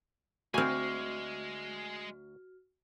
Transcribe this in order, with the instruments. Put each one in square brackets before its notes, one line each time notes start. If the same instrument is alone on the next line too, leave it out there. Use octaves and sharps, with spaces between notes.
[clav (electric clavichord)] D2 [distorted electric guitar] G#3 [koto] C4 G#5 [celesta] F#4 F6